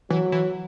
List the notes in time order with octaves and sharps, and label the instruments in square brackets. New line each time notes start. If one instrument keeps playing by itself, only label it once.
[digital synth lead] E3 [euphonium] F#3
[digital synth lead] E3